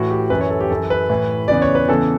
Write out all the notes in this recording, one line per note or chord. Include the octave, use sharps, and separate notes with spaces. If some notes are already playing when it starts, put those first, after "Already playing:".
Already playing: A2 E3 F#4
G4
F#2 E3 B4
C#5
A4
G4
F#2 E3 A4
B4
A2 E3
E2 C#3 E3 D5
C#5
B4
E2 C#3 E3 A4